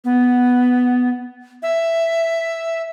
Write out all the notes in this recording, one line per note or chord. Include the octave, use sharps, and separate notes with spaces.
B3
E5